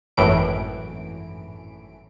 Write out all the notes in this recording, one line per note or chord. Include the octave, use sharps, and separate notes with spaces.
G#1 F#2 A2 E3 D7